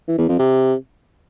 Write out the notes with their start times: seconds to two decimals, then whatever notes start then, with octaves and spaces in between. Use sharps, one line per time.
0.08 E3
0.18 E2
0.29 F2
0.39 C3